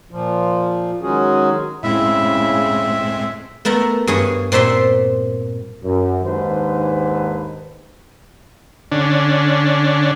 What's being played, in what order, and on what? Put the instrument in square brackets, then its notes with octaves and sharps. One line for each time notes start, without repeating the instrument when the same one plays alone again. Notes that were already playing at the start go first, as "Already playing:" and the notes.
[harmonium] A#2 F3
D#3 F#3 G#3 C#4 F#4 G#4
[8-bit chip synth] A2 G#3 C4 [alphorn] C#3 [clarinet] E4 [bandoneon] E5
[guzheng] A3 B3 A#4 E5
G2 G#4 C#5 G#5
A#2 C4 C5 E5 C6
[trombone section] F#2
D#2 G#2 D#3 D4 B4 C5
[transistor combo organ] D3 C#4 D4